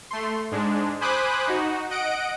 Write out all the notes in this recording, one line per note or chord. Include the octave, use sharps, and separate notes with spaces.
A3 C6
G#2 G#3 D4
C5 G#5 B5 D6 D#6 F#6
D#4 F#4
D#5 F#5 D7